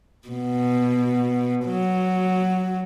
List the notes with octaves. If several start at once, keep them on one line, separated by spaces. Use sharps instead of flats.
B2
F#3